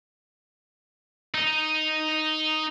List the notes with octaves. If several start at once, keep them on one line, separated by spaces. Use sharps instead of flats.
D#4